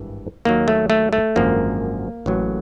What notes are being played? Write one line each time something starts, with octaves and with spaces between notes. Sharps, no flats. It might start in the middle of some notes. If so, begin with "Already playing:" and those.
Already playing: G#1 G2 E3
D#2 D#3 F#3 A#3
A3
A3
A3
G#1 F#2 D3 F3 A#3
A1 A2 F#3